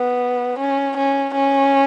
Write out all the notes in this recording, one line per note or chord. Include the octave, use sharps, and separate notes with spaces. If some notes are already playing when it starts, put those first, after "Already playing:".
Already playing: B3
C#4
C#4
C#4